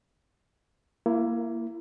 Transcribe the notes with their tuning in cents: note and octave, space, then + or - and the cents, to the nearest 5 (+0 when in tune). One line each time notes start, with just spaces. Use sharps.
A#3 +0 E4 +25